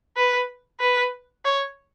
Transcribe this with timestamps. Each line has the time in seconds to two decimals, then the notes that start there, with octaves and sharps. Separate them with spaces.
0.16 B4
0.80 B4
1.45 C#5